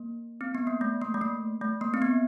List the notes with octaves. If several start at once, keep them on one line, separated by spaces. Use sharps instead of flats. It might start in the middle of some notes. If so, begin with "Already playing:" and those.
Already playing: A#3
C4
B3
A#3
A3
A#3
A3
A#3
A3
A#3
C4
B3